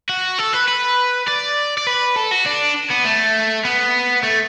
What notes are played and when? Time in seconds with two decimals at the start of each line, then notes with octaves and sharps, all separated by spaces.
0.09 F#4
0.39 A4
0.53 B4
0.68 B4
1.28 D5
1.78 D5
1.87 B4
2.16 A4
2.31 F#4
2.46 D4
2.91 B3
3.05 A3
3.65 B3
4.23 A3